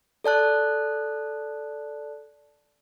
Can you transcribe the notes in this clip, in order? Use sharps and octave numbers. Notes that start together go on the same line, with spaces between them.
A4 D5 A5 F#6